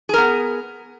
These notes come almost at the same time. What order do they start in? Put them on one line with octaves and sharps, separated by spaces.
G#4 A#4 B3